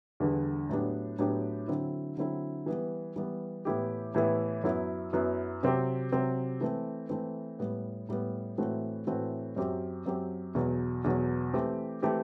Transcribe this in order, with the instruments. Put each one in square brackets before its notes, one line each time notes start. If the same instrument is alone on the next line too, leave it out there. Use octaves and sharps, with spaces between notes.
[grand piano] E2 D3 G3 B3
A2 F#3 B3 D4 G4
A2 F#3 B3 D4 G4
D3 F#3 C4 E4
D3 F#3 C4 E4
E3 G3 B3
E3 G3 B3
A2 E3 B3 E4 G4
A2 E3 B3 E4 G4
F#2 F#3 B3 E4
F#2 F#3 B3 E4
C3 F#3 C4 G4
C3 F#3 C4 G4
E3 A3 C4
E3 A3 C4
A2 G3 B3
A2 G3 B3
A2 E3 A3 C4 F#4
A2 E3 A3 C4 F#4
F#2 F#3 C4 G4
F#2 F#3 C4 G4
E2 B2 F#3
E2 B2 F#3
E3 A3 C4 G4
E3 A3 C4 G4